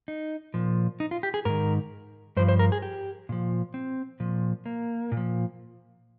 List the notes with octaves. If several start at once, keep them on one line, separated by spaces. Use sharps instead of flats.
D#4
A#2 F3
D#4
F4
G4
G#4
G#2 D#3 A#4
G2 F3 C5
C5
A#4
G#4
G4
A#2 F3
C4
A#2 F3
A#3
A#2
F3